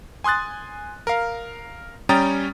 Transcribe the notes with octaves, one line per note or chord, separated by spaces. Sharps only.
G#5 C6 D#6 F#6 A6
A#4 F5
G3 C#4 G5 A#5 D#6 A6